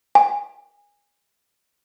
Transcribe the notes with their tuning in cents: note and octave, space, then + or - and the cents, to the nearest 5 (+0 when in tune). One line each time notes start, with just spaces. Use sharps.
G#5 -20